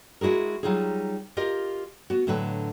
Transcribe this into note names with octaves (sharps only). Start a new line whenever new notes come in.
G#3 E4 F#4 G#4 A#4
F#3 G3 D#4 F4 G#4
F4 G4 A#4 D#5
B3 F#4
A2 D3 F#3 B4